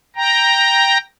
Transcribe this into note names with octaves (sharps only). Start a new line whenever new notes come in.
G5 A#5